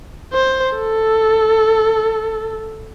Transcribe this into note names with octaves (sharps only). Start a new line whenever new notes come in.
C5
A4